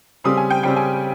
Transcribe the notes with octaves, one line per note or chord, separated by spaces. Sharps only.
C#3 G3 C4 D#6
G#5
G5
C#3 G3 C4 G5
G#5